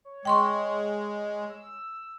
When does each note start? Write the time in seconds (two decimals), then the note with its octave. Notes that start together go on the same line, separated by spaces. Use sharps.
0.05 C#5
0.25 G#3 G5 C6 C#6
1.50 E6